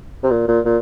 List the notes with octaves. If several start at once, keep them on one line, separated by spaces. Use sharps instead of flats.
C3
A#2
A#2
A#2